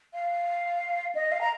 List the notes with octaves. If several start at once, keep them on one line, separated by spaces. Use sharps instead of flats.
F5
D#5
F5
A#5